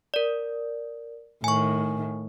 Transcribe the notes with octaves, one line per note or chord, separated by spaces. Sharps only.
A#4 D5
A2 D#3 G#5 C#6